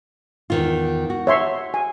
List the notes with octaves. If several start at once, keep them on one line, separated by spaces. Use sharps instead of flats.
E2 D#3 F4
F#4
C#5 E5 C6
G#5